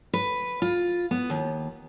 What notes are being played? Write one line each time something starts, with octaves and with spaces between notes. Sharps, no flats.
B4
F4
B3
D#2